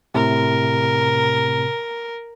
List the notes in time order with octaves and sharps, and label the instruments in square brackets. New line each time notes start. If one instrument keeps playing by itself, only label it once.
[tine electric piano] A2 C3 [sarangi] A#4